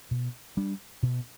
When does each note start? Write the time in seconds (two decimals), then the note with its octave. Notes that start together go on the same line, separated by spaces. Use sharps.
0.11 B2
0.57 G3 D4
1.03 B2